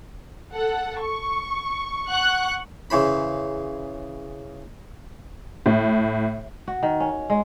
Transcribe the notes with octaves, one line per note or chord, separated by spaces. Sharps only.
A4 F#5
C#6
F#5 F#6
C#3 E3 C5 B5
A2
F#4
D#3
C#4
G#3